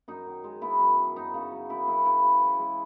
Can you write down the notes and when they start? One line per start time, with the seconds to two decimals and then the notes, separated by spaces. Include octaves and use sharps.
0.08 F#2 D#4
0.27 D#3
0.44 G#3
0.62 B3 E4
0.80 F#2
0.97 D#3
1.16 F#2 D#4
1.34 C#3
1.51 F#3
1.69 F#2 E4
1.87 F#2 E4
2.05 C#3 E4
2.23 C#3
2.41 E3
2.59 G#3